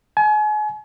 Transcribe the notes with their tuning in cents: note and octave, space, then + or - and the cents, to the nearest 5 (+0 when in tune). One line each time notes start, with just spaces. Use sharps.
G#5 +35